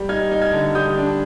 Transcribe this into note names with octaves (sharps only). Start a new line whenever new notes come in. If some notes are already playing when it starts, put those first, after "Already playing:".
Already playing: G3
D#4 F6 G#6
D#4
F6 G#6
D3
G3 D#6 G6
D4